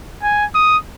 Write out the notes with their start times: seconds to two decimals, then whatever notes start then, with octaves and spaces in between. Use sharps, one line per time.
0.23 G#5
0.55 D#6